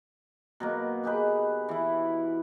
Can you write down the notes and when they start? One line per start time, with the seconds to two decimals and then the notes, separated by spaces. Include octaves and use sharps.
0.60 B2 F#3 A#3
1.03 D#4 G4 G#4 B4
1.69 E3 E4